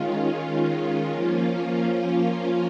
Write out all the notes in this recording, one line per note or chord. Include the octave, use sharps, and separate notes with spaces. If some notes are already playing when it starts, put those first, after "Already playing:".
Already playing: D#3 G#3 C#4 F4
F3 A#3 C#4 F4